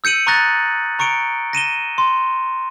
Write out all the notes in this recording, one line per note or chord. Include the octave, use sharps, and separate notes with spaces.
E6 G6 C#7 D#7 F#7
A#5 C#6 D#6 F#6 A6 A#6
A#5 C#6 C#7 D7 G7
A#6 D#7 E7 G7
C6